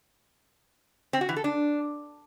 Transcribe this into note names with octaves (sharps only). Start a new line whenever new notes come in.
C4
F#4
E3
A4
D4